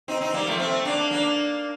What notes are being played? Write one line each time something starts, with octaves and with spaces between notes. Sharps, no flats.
C4 D#4
C4 D#4
G3 A#3
F3 A3
A3 C4
A#3 D4
A#3 D4